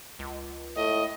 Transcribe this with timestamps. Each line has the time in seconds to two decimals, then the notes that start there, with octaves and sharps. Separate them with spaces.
0.19 C#2
0.76 A2 D#5